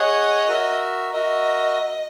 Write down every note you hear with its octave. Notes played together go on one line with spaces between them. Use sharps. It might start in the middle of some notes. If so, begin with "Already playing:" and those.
Already playing: G#4 C#5 D#5 F#5
F#4 A#4 E5
F#4 A#4 D#5 E5